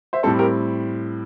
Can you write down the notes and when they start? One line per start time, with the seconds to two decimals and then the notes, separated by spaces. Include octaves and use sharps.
0.13 C5 E5
0.23 A2 G3 C4 A4 C5
0.39 G4 A#4